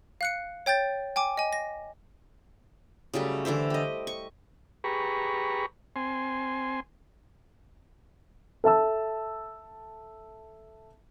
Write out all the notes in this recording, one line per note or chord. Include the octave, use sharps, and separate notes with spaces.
F5 F#6 C#7
C#5 G5 G6 A6
G5 G#5 D6
D#5 G#5
A#6
C#3 F#3 G3 A3
D3 E3 E4 C5
G4 D#5
C#6
G4 G#4 B4 A#5 B5 C#6
C4 G#5 C6
A4 E5 A5 E6